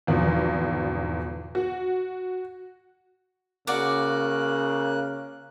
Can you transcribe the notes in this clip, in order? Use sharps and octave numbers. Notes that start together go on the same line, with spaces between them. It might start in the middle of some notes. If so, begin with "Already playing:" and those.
G#1 E2 B2 D3 F3
F#4
C#3 A#3 F#4 A#4 D5 F#6